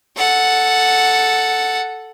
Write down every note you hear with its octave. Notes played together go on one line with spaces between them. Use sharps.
A4 F#5